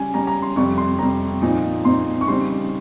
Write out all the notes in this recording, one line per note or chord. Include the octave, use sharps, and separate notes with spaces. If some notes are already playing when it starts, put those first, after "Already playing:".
Already playing: C#3 G3 C#4 G#5
C#3 G3 C#4 A#5
A#5
C6
F2 C3 G3 C#6
C6
F2 C3 G3 A#5
A#2 F3 C4 D#4
A#2 F3 C4 D#4 C6
C#6
C#3 G3 C4 D#4 C6